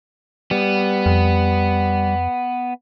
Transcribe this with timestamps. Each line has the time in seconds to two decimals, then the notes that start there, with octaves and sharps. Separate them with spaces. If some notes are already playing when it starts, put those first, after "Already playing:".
0.51 G3 B3
1.06 F2